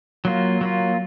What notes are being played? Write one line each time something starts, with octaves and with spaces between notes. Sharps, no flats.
F#3 A#3 F4
F#3 A#3 F4